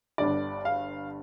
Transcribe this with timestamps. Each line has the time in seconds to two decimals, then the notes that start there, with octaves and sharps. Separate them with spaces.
0.18 G1 G2 D3 D5
0.65 F5